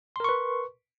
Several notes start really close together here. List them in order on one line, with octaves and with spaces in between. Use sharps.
C6 A#4 C#6 B4